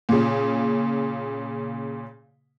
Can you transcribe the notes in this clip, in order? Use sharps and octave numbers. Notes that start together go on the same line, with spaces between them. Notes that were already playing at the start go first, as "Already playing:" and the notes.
A#2 C#3